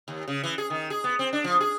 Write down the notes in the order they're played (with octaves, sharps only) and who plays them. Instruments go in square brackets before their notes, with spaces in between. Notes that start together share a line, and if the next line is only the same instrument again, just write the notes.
[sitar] D#2
C#3
E3
G#4
D#3
G#4
B3
C4
D4
F3
G#4